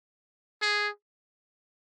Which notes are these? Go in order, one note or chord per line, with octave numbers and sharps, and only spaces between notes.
G#4